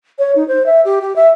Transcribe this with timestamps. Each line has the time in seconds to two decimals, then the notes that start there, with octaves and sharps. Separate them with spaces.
0.19 C#5
0.36 D#4
0.48 C5
0.66 E5
0.85 G4
1.02 G4
1.16 E5